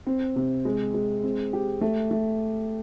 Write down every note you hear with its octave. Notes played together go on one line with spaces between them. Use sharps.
C4
C3
G#3
G#3
C4
G4
A3
A3